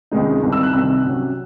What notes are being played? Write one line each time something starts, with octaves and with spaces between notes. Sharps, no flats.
C#2 C3 D#3 G#3 D#4
C2 C3 D#3
E6
F#6
C2 C3 D#3 E6
C3 F#3 C#4